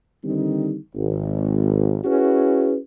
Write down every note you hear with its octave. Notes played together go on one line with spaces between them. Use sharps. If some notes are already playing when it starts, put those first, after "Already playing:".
D3 D#3 G3 C4 D#4
G#1
C#4 E4 F#4 G#4 B4